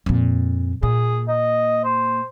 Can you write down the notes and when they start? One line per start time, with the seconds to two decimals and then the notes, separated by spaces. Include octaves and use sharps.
0.06 F2 A#2
0.83 A#2 G#4
1.28 D#5
1.84 C5